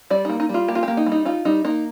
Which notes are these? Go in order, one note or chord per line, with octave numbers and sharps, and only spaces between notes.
G3 D5
A#3 D#4
D#4
G3 F4
A#3 G4
F4
A#3 G4
D#4
G3
D#4
D#4 F4
G3 D#4
A#3 D#4